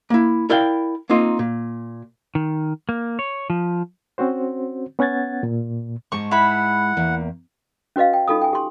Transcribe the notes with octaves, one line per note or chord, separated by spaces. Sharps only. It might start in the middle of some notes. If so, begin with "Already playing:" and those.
A#3 E4
E4 A#4 D5 F5 G5
A#3 C4 D#4 F4
A#2
D#3
A#3
C#5
F3
C4 C#4 F#4 C5
B3 C#4 F#5 G#6 A6
A#2
G#2 G#3 A5 C#6
E4 F#5 B5
E2 A#3
C#4 F#4 B4 D#5 F5
G5
D#4 F4 A4 A5 D#6
G5 G#5
G4 C6